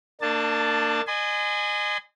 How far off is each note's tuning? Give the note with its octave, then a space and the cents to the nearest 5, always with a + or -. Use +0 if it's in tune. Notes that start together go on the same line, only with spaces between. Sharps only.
A#3 -30 D4 +25 A5 +0
D#5 -35 G#5 +0 C6 -40